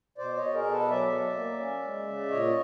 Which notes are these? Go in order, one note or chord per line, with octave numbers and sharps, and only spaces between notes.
B2 C5 D5
C#5 D#5
B2
G#4 A#4
B2
A4 B4
F#3 D5 E5
F#3
A#3
C#4
G#3
C#3
A#2 C#5 D#5